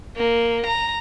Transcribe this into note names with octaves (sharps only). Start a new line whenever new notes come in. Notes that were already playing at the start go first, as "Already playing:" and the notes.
A#3
A#5